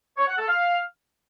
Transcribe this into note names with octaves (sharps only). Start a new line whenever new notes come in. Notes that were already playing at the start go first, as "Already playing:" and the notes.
C#5
F#5
A4
F5